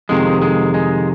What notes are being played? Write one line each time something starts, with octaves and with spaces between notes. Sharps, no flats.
F2 C3 D#3 G#3
G#3
G#3